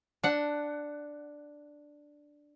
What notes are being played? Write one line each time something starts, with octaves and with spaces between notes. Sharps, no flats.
D4 F#5